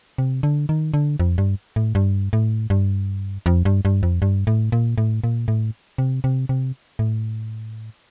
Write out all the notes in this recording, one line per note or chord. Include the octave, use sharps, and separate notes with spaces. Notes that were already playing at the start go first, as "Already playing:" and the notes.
C3
D3
D#3
D3
F2
G2
A2
G2
A2
G2
F2
G2
G2
F2
G2
A2
A#2
A2
A#2
A2
C3
C3
C3
A2